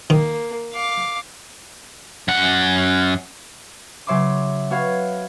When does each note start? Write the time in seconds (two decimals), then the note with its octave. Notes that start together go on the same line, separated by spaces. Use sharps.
0.10 D#3 A#3
0.73 F5 D6
2.28 F#2 F#5
4.07 C#3 F#3 C#5 E5 C6 D6
4.70 B3 F#4 C#5 F5 G#6